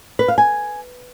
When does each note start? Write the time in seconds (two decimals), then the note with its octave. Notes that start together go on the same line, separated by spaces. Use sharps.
0.19 B4
0.28 F5
0.38 G#5